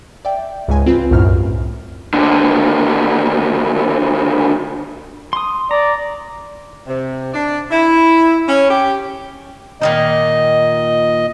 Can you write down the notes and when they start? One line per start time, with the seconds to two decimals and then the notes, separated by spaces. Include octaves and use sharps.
0.25 D5 E5 G5
0.68 C#2 G#2 G#5
0.86 C4 F4 B4
1.11 C2 F#2 A2 F6
2.14 D#2 D3
5.33 C6 D#6
5.71 D5 A#5
6.86 C3
7.33 D4
7.71 E4
8.48 C#4
8.69 G4
9.81 A#2 D#3 D#4 D#5